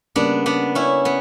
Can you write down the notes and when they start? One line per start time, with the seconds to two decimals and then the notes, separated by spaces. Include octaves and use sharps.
0.16 C#3 G3 A#3 B3 D4
0.46 B3 D4
0.75 C#4 E4
1.05 B3